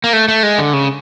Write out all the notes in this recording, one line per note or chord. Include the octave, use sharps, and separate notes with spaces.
A#3
A3
A3
G#3
D3
C#3